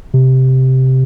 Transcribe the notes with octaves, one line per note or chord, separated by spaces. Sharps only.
C3